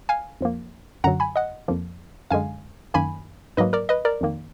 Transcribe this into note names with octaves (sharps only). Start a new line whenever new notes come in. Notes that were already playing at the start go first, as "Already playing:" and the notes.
F5 G#5
F2 F3 A#3
F#2 D3 F#3 F#5 A#5
G#5 B5
D#5 F#5
F2 F3 A#3
F#2 D3 G#3 F5 G#5
F#2 D#3 A#3 G#5 B5
G#2 F#3 A#3 B4 D#5
A#4 D5
B4 D#5
A#4 D5
F2 D#3 A#3